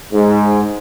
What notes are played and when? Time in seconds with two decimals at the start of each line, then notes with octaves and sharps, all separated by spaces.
0.13 G#2